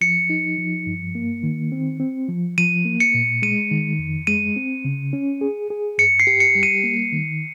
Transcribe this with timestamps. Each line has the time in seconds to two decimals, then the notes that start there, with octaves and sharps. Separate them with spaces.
0.01 F3 C#7
0.30 D#4
0.58 F3
0.87 G2
1.15 A#3
1.43 D#3
1.72 C4
2.00 C4
2.29 F3
2.58 F3 D#7
2.85 A#3
3.00 C#7
3.14 A#2
3.42 G#3 D#7
3.71 D#3
3.99 F2
4.27 G#3 D#7
4.56 C4
4.85 C#3
5.13 C#4
5.41 G#4
5.70 G#4
5.98 G2 C#7
6.20 C7
6.27 G4
6.40 C#7
6.55 G3
6.63 D#7
6.84 A#3
7.12 D#3